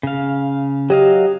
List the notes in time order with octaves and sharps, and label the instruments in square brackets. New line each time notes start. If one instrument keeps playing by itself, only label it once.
[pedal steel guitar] C#3 F5
[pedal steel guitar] F#3 D#5 F5 [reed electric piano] G4